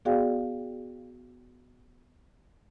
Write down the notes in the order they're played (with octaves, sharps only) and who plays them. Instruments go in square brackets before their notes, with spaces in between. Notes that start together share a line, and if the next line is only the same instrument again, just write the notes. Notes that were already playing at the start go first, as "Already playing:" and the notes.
[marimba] B3 F#4 G#4 D5 F5 G5